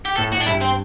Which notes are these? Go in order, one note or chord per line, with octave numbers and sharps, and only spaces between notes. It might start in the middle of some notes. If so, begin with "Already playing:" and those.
G4
A2 A4
A2 F#4
D4
G2 E4
C4